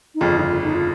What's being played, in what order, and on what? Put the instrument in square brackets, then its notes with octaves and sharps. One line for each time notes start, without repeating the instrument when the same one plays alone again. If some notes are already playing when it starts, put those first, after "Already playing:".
[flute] D#4
[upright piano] G1 F2 C#3 [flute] F4
[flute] D#4
F4
D#4
F4